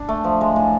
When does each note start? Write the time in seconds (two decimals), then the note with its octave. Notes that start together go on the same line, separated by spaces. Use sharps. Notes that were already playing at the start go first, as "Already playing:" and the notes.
Already playing: D4
0.09 A3
0.24 F3
0.41 G#3
0.56 A2